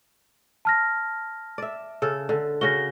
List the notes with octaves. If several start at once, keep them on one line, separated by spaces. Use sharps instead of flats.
A5 F6 A#6
D5 E5
C#3 A4
D3
C#3 F#4 A#6 G7